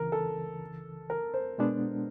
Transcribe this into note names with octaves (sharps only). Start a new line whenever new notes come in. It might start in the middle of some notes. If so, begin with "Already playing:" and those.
Already playing: C#2 C#3 E3 A#4
A4
A#4
C5
B2 G#3 B3 D4